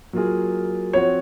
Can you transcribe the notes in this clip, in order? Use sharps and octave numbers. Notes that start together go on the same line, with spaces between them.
F#3 A#3 F4 G#4
F3 C4 F#4 C#5